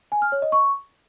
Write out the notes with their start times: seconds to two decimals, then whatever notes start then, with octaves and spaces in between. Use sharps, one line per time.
0.12 G#5
0.22 F6
0.32 C#5
0.42 D#5
0.52 C#6